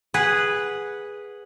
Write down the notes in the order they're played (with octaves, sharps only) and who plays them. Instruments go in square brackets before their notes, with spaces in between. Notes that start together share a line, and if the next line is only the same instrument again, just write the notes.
[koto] G#4 B4 F#5